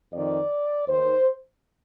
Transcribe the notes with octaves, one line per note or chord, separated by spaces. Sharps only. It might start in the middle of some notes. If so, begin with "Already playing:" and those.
F2 D#3 D5
D#2 D#3 C5